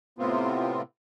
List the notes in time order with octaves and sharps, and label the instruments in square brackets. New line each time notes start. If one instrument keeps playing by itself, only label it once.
[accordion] A2 C3 B3 C4 F4